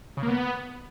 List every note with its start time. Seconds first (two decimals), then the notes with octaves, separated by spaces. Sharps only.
0.17 C#3
0.23 A#3
0.28 B3